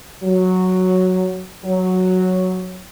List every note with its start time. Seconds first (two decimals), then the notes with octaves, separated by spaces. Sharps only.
0.22 F#3
1.65 F#3